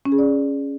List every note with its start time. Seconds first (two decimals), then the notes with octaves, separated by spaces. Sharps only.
0.06 C#4
0.12 G#4
0.18 D5